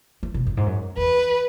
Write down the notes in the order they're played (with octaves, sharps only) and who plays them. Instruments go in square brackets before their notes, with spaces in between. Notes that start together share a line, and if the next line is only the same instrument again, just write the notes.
[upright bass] E3
B2
F#2
G#2
F#2
[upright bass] E2 [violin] B4